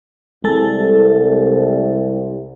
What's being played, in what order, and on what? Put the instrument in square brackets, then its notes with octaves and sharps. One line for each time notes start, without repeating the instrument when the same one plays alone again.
[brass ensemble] C2 [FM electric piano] G#3 A4